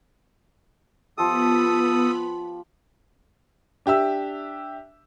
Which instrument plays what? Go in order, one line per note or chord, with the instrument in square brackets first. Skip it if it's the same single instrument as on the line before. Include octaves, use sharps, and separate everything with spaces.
[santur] F3 G4 [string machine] B3 B5 [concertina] A4 D#6
[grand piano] D4 G4 E5 E6